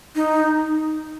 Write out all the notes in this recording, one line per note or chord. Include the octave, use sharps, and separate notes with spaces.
D#4